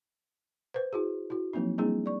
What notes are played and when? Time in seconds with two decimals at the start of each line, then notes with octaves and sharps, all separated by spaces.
0.74 B4 C5
0.93 E4 F#4 G#4
1.30 E4 F#4
1.53 F3 F#3 A#3 C4 D#4
1.78 G3 A#3 C4 D4 E4 G#4
2.06 D5 C#6